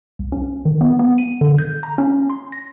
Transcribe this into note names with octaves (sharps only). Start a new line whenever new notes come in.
C2
C#4
D#3
B3
B3
D#7
D3
G6
A#5
C#4
C6
A#6